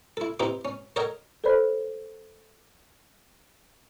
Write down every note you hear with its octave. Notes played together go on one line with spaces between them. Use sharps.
E4 A4
C4 D#4 E4 G4 B4
C#4
A4 A#4 C#5 D#5 F#5 G5
A4 B4 C5 D5 B5